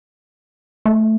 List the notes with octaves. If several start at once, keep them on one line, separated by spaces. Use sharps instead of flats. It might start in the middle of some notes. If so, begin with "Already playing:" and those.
A3